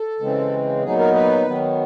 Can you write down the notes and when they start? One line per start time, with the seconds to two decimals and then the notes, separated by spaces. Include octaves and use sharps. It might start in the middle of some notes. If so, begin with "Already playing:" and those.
Already playing: A4
0.20 C#3 E3 G#3 C4
0.83 A#2 F#3 B3 D#4 G#4
0.99 A#4
1.15 B4
1.47 D#3 F#3 B3